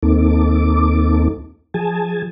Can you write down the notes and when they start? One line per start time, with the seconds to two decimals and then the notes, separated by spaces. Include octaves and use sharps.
0.03 D#2 A#3 C4 D#4 A4 D6
1.74 F3 G#4 G#5 A5